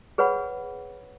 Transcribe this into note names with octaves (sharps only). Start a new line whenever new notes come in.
G#4 B4 C#5 F#5 B5